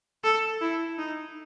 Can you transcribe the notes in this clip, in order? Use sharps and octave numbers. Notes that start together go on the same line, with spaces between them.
A4
E4
D#4